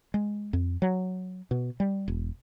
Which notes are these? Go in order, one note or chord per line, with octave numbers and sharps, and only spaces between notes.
G#3
F2
F#3
B2
G3
E1